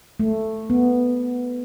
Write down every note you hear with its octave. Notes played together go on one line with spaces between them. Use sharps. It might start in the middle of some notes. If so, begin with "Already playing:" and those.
A3
B3